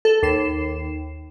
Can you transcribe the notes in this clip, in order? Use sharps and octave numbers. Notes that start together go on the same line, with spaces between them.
A4
D#2 C7 E7